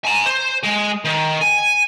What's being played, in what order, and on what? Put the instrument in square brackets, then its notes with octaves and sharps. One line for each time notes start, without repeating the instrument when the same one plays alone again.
[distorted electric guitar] G#5 A#5
C5
G#3
D#3
G#5